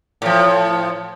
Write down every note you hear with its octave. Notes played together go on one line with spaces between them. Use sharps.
A2 F3